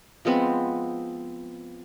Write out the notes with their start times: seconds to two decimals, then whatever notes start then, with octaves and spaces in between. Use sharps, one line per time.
0.25 F3 G#3 B3 C4